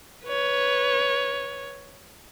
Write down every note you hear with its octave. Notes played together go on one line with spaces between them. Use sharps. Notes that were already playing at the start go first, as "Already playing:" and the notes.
B4 C#5